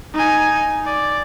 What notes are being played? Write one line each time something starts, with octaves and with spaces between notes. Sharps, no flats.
D#4 G#5
D5